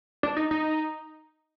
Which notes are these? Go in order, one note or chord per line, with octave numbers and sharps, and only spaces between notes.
D4
D#4
D#4